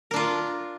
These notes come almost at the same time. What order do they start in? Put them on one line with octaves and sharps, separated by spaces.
A#4 D4 F4